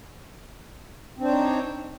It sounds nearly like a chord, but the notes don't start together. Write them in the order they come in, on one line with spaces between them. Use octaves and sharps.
C4 D4 C5 C#5 D#4